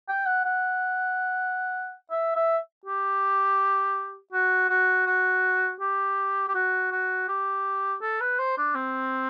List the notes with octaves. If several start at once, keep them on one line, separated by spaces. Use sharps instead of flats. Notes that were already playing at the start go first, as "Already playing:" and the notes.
G5
F#5
F#5
E5
E5
G4
F#4
F#4
F#4
G4
G4
F#4
F#4
G4
A4
B4
C5
D4
C4